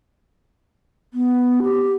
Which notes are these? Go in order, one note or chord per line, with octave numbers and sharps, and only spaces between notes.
B3
G4